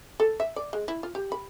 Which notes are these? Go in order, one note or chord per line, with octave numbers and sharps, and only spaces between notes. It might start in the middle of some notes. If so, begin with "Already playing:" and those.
A4
E5
D5
G#3
E4
F4
G4
B5